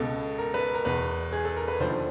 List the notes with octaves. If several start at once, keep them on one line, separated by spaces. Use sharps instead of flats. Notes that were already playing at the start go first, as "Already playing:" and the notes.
Already playing: C#2 B2 A4
A#4
B4
A#4
E2 B2 B4
G#4
A4
A#4
B4
D#2 D3 F3 C5